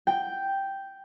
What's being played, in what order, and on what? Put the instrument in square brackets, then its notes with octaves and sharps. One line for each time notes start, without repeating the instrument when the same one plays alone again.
[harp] G5